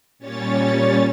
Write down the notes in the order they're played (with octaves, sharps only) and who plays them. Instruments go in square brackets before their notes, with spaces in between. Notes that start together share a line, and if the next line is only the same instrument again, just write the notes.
[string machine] A#2 G3 C#4 C#5 A6